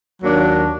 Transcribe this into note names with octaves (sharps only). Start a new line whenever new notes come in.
D#2 D#3 F#3 A#3 D4